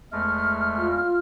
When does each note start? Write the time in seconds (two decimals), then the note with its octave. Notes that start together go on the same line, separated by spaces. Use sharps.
0.12 E2 G#3 A3 F6
0.79 F4